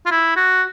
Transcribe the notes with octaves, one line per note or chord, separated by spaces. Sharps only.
F4
E4
F#4